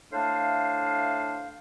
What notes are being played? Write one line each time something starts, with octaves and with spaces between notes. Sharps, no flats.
A2 A3 D4 C5 F5